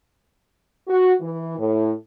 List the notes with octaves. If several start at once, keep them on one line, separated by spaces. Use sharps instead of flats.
F#4
E3
A2